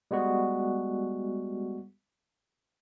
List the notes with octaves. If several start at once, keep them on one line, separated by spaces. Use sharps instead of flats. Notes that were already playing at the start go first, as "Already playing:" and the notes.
G3 G#3 B3 F#4